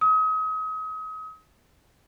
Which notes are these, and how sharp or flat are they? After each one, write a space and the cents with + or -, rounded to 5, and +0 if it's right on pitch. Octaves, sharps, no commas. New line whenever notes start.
D#6 +35